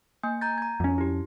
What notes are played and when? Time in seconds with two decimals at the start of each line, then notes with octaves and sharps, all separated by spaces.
0.23 A#3 G#5
0.41 A#5 G6 A6
0.58 A#5 G#6
0.80 F2 C#4
0.98 E4 G4